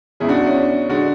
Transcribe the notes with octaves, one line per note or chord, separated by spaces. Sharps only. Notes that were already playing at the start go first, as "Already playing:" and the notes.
E2 C#3 G#3 E4 G#4
D4 F#4
C#4
D4
D3 G#3 D4 F#4